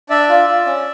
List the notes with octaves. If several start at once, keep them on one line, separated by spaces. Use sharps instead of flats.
D4 D5 E5
F4
F4
C#4